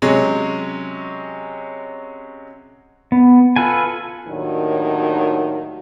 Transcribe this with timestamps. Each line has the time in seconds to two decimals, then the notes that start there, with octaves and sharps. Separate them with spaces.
0.02 C3 F#3 G#3 C#4
3.12 B3
3.56 F4 A4 B4 G#5
4.28 D#2 A2 D#3 F#3 D4